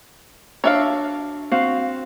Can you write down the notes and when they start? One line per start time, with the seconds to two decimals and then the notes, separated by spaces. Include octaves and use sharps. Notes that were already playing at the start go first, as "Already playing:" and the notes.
0.64 D4 F#4 C#5 E5 F5
1.51 C4 F#4 F5